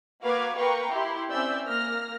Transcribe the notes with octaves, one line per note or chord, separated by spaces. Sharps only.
A#3 F#4 B4 F5 D6 G#6
A#3 B4 F5 G5 A#5 C#6
E4 G4 C6
C4 C#4 D5 E5 E6 G6
A#3 F6 A#6